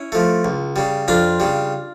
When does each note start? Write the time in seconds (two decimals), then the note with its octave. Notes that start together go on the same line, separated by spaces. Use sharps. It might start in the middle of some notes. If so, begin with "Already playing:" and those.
Already playing: C#4 E4
0.12 F3 A3
0.45 C#2
0.76 C#3 G3
1.08 F2 D4 F4
1.40 C#3 G3